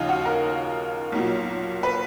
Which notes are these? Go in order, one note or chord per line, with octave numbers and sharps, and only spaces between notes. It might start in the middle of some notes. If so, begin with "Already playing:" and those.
Already playing: D#2 C#3 F3 D#4 F4
F#4
A#4
B1 A#2 F#3
B4